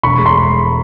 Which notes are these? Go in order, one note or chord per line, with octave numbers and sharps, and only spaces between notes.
E1 B5 C#6
G#3
A#5 C6